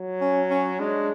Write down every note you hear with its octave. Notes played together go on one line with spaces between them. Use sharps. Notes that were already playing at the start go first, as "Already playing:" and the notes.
Already playing: F#3
C#4
C#4
G#3 D4